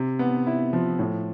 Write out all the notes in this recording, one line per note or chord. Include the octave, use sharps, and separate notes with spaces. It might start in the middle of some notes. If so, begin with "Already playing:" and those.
Already playing: C3
B3
E4
F3
A2